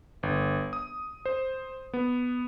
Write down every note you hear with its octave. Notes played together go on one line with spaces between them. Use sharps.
G1
D#6
C5
B3